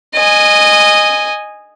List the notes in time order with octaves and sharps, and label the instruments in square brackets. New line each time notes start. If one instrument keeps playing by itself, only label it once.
[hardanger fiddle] D#5 G#5